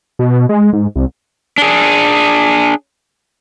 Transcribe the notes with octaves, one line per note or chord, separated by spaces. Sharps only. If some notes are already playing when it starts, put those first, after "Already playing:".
B2
G#3
G#2
C2
D4 G#4